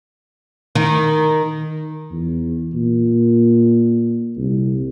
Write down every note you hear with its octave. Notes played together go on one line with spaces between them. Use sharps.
D#3
E2
A#2
C2